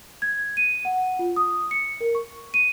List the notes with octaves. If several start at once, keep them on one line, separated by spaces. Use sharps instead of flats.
G#6
D#7
F#5
F4
D#6
C#7
A#4
C#6
D#7